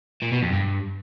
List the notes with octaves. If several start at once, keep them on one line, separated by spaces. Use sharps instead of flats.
A#2
B2
F2
G2